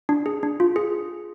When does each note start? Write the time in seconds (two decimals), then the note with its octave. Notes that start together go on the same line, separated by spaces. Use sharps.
0.09 D4
0.26 G#4
0.43 D4
0.60 F4
0.76 G#4